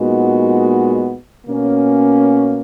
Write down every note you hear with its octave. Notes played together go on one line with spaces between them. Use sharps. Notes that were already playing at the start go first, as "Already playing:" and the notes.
Already playing: A#2 G#3 B3 D#4 F#4
B2 A#3 C#4